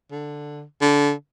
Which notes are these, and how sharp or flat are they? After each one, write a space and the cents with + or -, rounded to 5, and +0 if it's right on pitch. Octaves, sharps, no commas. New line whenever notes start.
D3 +5
D3 -25